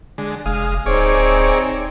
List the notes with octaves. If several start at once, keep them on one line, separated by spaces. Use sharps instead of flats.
D3 G#3
F1 G#3 F5 D#6
D1 C4 D#4 G#4 C#5 D5